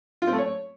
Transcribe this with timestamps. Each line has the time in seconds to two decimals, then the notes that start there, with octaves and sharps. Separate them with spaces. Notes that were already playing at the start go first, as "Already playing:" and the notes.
0.22 F4
0.27 C4
0.33 A3
0.38 C#5